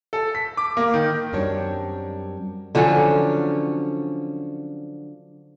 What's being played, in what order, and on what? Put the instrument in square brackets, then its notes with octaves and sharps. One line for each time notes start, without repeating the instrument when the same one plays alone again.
[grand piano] A4
B6
D6
A#3
D#3
[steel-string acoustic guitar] F#2 G3 C4 D4 C#5
[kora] D3 F3 F#3 C#4